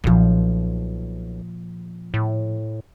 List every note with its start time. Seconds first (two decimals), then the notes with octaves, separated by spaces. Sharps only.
0.04 B1 A#2 F3
2.14 A2